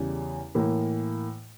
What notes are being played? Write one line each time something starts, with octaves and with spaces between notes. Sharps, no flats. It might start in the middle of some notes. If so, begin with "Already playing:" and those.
Already playing: E2 C#3 G3 C#4
A2 E3 A#3